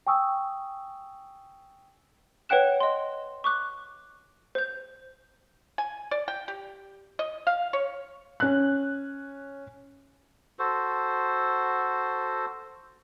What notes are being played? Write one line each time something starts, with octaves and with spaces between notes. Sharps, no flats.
G5 G#5 C#6 D#6 E6
B4 C#5 F#5 G5 F#6 E7
D#5 C6
C#6 D6 F#6
C5 G6
G#5
D5
G5
G4
D#5
F5
C#5
C#4 F#6
F#4 A4 C5